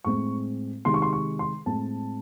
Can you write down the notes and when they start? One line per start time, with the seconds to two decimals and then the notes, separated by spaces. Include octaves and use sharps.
0.04 A2 G#3 C4 C#6
0.85 C3 D#3 G#3 C6
0.94 C#6
1.02 C6
1.13 C#6
1.39 C6
1.66 A2 G#3 C4 A5